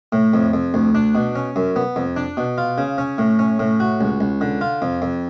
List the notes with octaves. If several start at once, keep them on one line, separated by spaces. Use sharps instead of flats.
A2
F2
F2
D2
D4
B2
C#4
F#2
B3
F2
D4
B2
F4
C#3
C#4
A2
C#4
A2
F#4
C#2
C#2
D3
F4
F2
F2